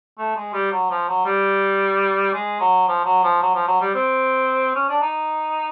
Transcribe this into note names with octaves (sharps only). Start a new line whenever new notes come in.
A3
G#3
G3
F#3
F3
F#3
G3
G#3
F#3
F3
F#3
F3
F#3
F3
F#3
G3
C4
C#4
D4
D#4